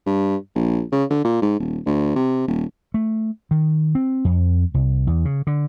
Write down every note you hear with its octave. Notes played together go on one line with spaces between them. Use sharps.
G2
A#1
C#3
D3
A#2
G#2
D#1
D2
C3
D#1
A3
D#3
C4
F2
C2
E2
C#3
D3